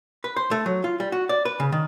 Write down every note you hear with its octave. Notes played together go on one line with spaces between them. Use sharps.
B4
C5
A3
F#3
F4
G3
F#4
D5
B4
C#3
D#3